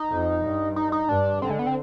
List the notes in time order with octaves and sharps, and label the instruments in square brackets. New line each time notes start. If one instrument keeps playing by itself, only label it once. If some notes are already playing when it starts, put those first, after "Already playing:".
Already playing: [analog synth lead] D#4
[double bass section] F2
G2
[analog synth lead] D#4
D#4
[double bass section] G2 [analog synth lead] D4
[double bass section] D3 [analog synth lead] C4
[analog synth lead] G#3
B3
C4